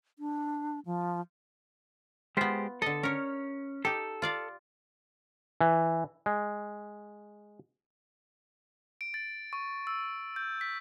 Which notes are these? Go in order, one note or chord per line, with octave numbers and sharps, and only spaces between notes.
D4
F3
G#3 B3 F4 G4 C5
D3 A4 D#5
C#4 A#4 C#5
D#4 G4 A4
F4 D5 F5
E3
G#3
D7
A6
C#6
E6
G6
B6